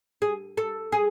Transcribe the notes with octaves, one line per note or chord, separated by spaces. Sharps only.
G#4
A4
G#4